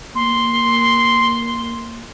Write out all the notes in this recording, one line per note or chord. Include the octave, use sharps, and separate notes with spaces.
A#3 C6